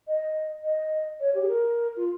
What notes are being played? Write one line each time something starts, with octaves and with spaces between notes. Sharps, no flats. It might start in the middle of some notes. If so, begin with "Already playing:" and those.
D#5
D#5
C#5
G4
G#4
A#4
F4